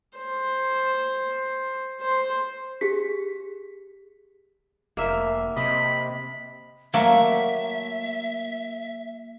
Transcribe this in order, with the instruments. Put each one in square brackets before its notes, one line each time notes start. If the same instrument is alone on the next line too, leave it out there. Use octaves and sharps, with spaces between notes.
[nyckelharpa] C5
C5
[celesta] G4 G#4 B6
[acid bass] F1 [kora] A#3 E5
[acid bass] C3 [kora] D#5 [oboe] B5
[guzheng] F#3 A3 A#3 [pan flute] E5